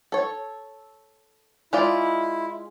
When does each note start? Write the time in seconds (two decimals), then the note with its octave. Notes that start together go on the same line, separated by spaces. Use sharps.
0.12 A4 C#5
1.73 G#3 E4 F4 D5